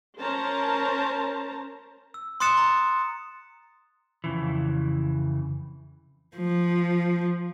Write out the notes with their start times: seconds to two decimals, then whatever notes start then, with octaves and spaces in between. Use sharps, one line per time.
0.19 C#4 A#4 C5 A5 A#5
2.14 E6
2.40 C6 D#6 F#6 A6 C#7 E7
2.57 A#5
4.24 F2 C#3 E3
6.37 F3